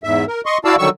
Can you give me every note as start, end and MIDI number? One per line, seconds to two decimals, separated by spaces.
0.04 0.25 40
0.04 0.25 44
0.04 0.25 76
0.28 0.41 70
0.46 0.58 75
0.46 0.58 84
0.46 0.58 85
0.65 0.76 64
0.65 0.76 66
0.65 0.76 74
0.65 0.76 77
0.65 0.76 81
0.65 0.76 88
0.79 0.89 50
0.79 0.89 51
0.79 0.89 54
0.79 0.89 55
0.79 0.89 85
0.79 0.89 88